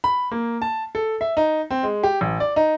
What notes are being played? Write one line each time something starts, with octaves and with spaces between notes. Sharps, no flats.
B5
A#3
A5
A4
E5
D#4
C4
G#3
G4
A1
D5
D#4